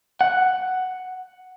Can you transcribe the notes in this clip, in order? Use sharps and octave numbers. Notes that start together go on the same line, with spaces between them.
F#5